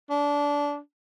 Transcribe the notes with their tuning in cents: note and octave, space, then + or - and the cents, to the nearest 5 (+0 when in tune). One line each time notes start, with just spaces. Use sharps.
D4 -20